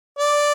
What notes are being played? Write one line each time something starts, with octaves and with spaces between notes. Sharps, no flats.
D5